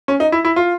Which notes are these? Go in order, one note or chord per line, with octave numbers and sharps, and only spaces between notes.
C#4
D#4
E4
E4
F4